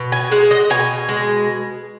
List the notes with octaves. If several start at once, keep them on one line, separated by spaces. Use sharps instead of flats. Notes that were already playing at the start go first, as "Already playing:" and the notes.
Already playing: B2
G#5
G#3 F#5
D#5
B2 G#5
G#3